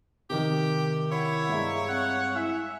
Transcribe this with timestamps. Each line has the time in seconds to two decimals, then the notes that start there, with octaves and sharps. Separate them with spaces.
0.30 C3 D#3 D#4 G4
1.12 E4 C#5 F#5
1.49 G2 G#3 E5 F5 A#5
1.89 C4 F5 F#5
2.35 E4 E5 G#5 F#6